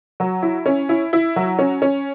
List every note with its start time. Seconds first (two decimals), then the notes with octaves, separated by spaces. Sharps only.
0.20 F#3
0.43 E4
0.66 C#4
0.89 E4
1.13 E4
1.36 F#3
1.59 C#4
1.82 C#4